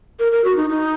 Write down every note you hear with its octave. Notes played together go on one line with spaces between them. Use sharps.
A#4
A#4
F#4
D#4
D#4